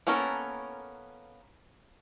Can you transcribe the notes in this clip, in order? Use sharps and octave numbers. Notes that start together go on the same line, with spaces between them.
A#3 B3 C#4 A4 A#4